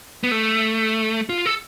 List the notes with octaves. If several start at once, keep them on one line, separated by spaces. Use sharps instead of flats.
B3
A3
F4
A4